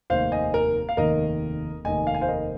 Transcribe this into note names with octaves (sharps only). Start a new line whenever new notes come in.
F1 D#2 D#3 C5 F5
D#5 G#5
A#4
F5
F1 D#2 D#3 A#4 D#5
F1 D#2 D#3 D#5 G#5
F5
G#5
C5 F5
A#4 D#5